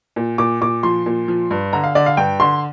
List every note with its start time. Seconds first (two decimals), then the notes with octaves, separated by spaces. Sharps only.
0.16 A#2
0.38 A#2 D6
0.61 A#2 D6
0.83 F3 C6
1.06 A#2
1.28 F3
1.51 G2
1.73 D3 A#5
1.84 F5
1.95 D3 D5
2.06 F5
2.17 G2 G5
2.40 D3 C6